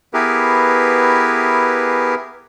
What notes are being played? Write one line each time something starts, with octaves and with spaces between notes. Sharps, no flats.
B3 E4 G4 G#4 A#4 B4